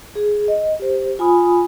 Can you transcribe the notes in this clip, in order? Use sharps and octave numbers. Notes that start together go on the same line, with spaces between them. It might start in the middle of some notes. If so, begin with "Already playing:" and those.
G#4
D#5
G4 C5
F4 G#5 B5 D#6